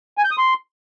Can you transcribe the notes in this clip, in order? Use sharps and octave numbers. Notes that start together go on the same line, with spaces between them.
G#5
G6
D#6
C6